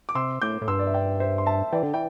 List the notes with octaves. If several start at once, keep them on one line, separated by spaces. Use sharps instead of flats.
D6
C3 C6 E6
A2 D6 G6
A2
G2 C6 E6
D5
E5
D5 G5
C5 E5
C6
E5 A5
E3 D5 G5
D3
E3 G5